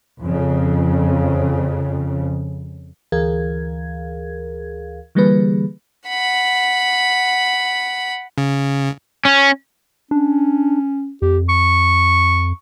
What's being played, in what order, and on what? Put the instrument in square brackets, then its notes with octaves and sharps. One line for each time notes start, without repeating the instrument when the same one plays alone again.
[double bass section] F2 C#3
[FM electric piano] D2 E3 G#4 A#4 F5 G#6
D3 E3 G3 A#3 G#4 B4
[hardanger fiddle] F#5 B5
[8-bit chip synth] C#3
[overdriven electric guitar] C#4
[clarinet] C#4 [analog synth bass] D4
[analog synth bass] F2 [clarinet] G4
[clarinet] C#6